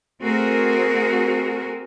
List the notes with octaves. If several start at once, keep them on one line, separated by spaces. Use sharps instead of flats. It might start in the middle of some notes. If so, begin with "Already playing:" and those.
A3 C4 F#4 G#4 A#4